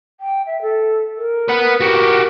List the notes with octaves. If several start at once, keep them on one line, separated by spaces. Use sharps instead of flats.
G5
E5
A4
A#4
B4 F#5
F#4 G4 A#4